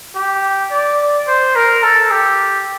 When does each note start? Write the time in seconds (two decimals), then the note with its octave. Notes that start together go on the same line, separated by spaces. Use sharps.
0.15 G4
0.71 D5
1.27 C5
1.55 A#4
1.83 A4
2.11 G4